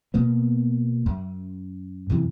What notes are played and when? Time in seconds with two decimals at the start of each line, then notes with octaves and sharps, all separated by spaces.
0.14 B2 A#3 B3
1.06 F#2
2.10 F#2 C3 E3